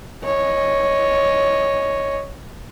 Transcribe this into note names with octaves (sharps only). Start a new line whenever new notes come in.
C#5 D#5